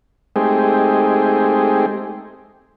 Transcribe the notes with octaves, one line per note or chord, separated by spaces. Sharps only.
G#3 A3 C4 D#4 G4 G#4